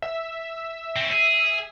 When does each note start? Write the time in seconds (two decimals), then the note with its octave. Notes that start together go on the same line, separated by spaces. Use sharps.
0.02 E5
0.96 C4 C#4
1.12 G#4